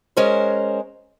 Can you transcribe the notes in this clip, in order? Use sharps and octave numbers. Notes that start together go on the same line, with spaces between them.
G#3 C#4 A#4 C5